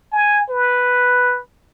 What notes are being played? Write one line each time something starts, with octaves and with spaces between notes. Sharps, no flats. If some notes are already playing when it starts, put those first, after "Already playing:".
G#5
B4